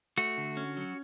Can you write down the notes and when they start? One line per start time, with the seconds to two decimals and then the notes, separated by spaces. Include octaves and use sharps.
0.18 A3 F#4
0.38 D3
0.57 C#4
0.77 F#3